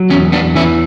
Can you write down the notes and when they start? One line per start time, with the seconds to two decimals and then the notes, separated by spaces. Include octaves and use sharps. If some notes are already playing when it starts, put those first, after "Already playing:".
Already playing: F#3
0.10 E2 C#4
0.32 B3 D4
0.55 E3 C#4 E4